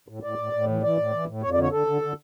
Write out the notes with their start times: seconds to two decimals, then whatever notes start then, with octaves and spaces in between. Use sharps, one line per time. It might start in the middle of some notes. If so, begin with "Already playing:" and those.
0.08 A2
0.23 A2 D5
0.38 A2
0.53 A2
0.68 E3
0.83 E3 D5
0.97 A2
1.12 E3
1.28 A2
1.42 F2 C#5
1.52 D5
1.57 D3
1.62 C#5
1.72 D3 A4
1.87 D3
2.02 D3